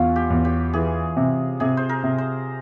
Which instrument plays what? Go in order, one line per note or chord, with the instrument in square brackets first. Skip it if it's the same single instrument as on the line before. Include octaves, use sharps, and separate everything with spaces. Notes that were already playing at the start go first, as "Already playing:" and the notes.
Already playing: [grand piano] E2 [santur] C#4 F4
[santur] G4
[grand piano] E2
[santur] G4
[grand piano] E3 [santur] G#4
[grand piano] C3
[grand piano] C3 [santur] G#4
[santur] C5
A#4
[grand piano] C3
[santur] C5